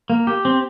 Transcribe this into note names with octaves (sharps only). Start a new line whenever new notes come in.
A#3
G4
C4